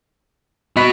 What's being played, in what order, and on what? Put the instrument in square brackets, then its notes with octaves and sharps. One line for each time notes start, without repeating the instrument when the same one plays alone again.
[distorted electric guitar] F#4 B5 [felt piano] D#5 F#6 B6